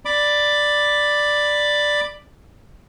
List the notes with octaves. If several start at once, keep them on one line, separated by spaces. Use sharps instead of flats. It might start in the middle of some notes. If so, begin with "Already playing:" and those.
D5 B5 D6